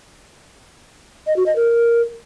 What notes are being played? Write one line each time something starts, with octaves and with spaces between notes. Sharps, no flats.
D#5
F#4
D#5
A#4